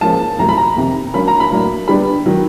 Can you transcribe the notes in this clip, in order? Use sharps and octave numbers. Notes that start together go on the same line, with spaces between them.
G#2 F3 A#3 C#4 A5
F2 C3 D#3 F#3 A3 A#5
B5
A#5
F2 C3 D#3
D3 F#3 A#3 C#4 B5
A#5
B5
A2 F#3 A#3 D4
D3 G3 B3 D4 B5
D#3 F#3